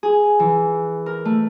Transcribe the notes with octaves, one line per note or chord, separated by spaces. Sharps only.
G#4
E3
A#4
A3